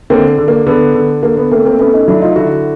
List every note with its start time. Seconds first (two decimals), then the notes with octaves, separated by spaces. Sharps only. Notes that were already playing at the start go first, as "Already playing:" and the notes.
0.10 D3 A#3 C4
0.38 D3
0.48 A#3
0.67 D3 B3
0.95 D3
1.23 D3 A#3
1.37 B3
1.51 A3 A#3 C4
1.65 A#3 C4
1.79 A3 B3 C#4
1.93 C#4 D#4
2.08 F#3 D4 E4
2.22 D#4 F4
2.36 D3 E4 F#4